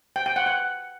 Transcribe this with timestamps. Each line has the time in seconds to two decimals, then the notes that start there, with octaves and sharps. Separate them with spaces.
0.16 G5
0.26 G5
0.36 F#5
0.46 F#5